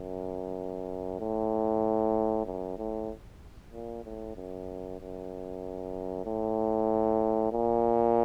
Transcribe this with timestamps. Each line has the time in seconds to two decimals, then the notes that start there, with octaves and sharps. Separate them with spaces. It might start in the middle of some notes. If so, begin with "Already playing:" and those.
Already playing: F#2
1.20 A2
2.45 F#2
2.78 A2
3.72 A#2
4.04 A2
4.36 F#2
4.99 F#2
6.25 A2
7.52 A#2